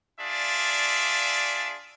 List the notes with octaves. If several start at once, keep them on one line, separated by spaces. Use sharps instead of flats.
D4 F4 G#4 D5 E5